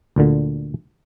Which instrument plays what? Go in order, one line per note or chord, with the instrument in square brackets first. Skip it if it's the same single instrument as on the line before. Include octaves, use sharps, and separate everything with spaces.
[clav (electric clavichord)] D2 A#2 D3